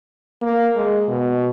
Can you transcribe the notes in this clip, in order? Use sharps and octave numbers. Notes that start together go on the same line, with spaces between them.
A#3
G#3
B2